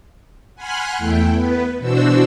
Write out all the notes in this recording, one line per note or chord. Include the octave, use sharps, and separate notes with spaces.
F#5 G#5 B5 C6 F6 F#6
E2 A3 E4 G5
B3 B4
B2 E3 D4 F#4 C5 E6